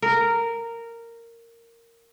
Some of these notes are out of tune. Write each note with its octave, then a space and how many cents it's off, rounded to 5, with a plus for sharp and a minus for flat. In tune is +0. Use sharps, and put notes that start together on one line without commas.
A#4 -10